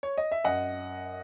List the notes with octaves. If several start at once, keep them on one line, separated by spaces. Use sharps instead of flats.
C#5
D#5
E5
F#2 D#5 F#5